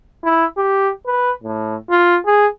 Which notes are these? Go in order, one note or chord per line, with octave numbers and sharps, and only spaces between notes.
E4
G4
B4
A2
F4
G#4